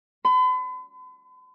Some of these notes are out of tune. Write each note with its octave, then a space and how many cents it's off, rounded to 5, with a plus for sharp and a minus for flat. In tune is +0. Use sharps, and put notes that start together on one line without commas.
B5 +45